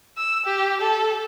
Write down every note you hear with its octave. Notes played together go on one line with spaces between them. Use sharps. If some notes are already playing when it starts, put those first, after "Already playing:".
E6
G4
A4